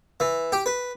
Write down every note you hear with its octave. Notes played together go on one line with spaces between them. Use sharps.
E3
G4
B4